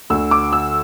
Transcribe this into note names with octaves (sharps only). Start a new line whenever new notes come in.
D2 D3 E6
D6
E6